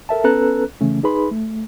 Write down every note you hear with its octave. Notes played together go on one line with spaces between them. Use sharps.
A4 A#4 E5 A5
B3 C#4 A4 B4 A#5 F#6
C#3 E3 A3 C#4
D#4 G#4 B4 B5 C6
A3